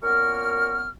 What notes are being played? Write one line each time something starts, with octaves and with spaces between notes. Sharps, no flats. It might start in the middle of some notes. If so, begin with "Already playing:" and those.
F#2 A#2 B3 A#4 C#6 F6